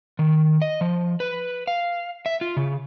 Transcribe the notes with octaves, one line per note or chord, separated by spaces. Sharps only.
D#3
D#5
F3
B4
F5
E5
F4
C#3